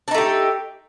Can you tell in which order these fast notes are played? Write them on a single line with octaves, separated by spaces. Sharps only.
D4 D#4 A3 G4